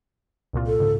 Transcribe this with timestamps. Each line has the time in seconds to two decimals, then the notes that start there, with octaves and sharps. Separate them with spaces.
0.53 C2 A#2 F4
0.67 A4
0.80 G#2 C#3